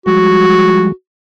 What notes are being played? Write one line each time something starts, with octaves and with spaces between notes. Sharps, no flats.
F3 G3 G#3 F#4